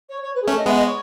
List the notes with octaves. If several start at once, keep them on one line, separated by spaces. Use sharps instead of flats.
C#5
C#5
B4
G#4
A3 C#4 A4
D#5
G#3 B3 E5
D#5
C#5